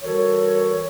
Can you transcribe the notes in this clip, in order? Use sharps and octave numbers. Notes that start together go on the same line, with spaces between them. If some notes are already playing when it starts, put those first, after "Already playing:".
E3 G3 F#4 A4 A#4 C#5